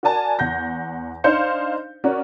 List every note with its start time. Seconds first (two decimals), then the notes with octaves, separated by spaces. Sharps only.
0.03 F#4 A#4 D5 G#5 A5
0.39 E2 F#5 G6 A#6
1.24 D4 D#4 C5 F5 G6 C#7
2.04 C#4 F#4 A#4 D5